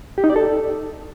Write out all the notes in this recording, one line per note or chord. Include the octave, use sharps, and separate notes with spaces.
G4
D#4
D5
A4